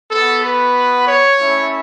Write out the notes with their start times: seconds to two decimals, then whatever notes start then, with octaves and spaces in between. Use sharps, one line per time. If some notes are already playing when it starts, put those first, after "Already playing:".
0.11 B3 F#4 A4
0.44 B4
1.08 C#5
1.40 A3 C#4 E4